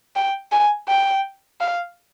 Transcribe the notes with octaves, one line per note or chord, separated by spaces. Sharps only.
G5
G#5
G5
F5